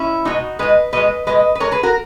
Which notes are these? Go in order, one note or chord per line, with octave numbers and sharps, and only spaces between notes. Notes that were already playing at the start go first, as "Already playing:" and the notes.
Already playing: C#4 E4
B2 G#3 D#4 F#4
B2 G#3 B4 D#5
B2 G#3 B4 D#5
B2 G#3 B4 D#5
B4
B2 G#3 A#4 C#5
G#4 B4
F#4 A#4